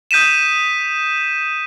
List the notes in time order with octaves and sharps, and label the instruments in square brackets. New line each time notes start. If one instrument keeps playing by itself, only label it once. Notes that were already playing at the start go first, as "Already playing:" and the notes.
[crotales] D#6 G6 B6 D#7 E7